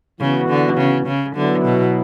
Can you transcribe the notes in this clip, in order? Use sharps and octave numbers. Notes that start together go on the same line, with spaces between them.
C#3 E3 B3 F#4
D3
C#3
C#3
D3 F#3 B3 E4
B2